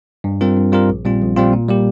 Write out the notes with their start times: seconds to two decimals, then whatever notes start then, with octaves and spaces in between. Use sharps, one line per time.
0.24 G2
0.41 G3 C4 F4 A#4
0.57 G2
0.72 G3 C4 F4 A#4
0.89 A#1
1.05 A#2 G3 C4 F4
1.21 A#1
1.36 A#2 G3 C4 F4
1.53 A#2
1.69 G3 A#3 G4